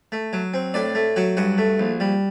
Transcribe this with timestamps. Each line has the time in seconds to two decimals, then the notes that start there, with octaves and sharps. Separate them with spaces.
0.12 A3
0.33 F#3
0.54 C4
0.74 A2 D4 D5
0.95 A3
1.16 F#3 F#4 F#5
1.37 G2 F#4 F#5
1.58 A3
1.79 A#1
2.00 G3